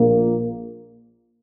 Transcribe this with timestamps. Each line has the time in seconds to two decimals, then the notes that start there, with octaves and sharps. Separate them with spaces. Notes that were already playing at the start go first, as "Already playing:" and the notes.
Already playing: A#1 A#2 A#3